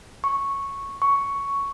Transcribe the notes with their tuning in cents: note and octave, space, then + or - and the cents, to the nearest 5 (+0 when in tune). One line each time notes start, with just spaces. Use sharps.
C#6 -5
C#6 +5